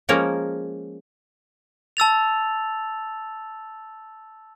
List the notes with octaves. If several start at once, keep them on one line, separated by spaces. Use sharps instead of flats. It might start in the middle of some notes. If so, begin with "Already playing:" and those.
F3 G#3 A#3 C#4 A#4
A5 E6 A6 F7